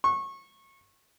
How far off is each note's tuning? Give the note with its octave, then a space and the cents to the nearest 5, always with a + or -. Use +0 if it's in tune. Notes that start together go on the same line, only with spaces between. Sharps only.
C#6 -25